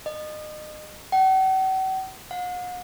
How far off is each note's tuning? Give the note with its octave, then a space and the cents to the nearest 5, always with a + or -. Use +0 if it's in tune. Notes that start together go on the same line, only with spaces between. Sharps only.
D#5 -30
F#5 +45
F#5 -45